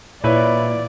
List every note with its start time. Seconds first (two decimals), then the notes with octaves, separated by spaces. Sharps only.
0.24 A#2 E4 B4 C#5 D5